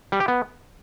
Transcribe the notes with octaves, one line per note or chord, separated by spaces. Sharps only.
G3
G4
B3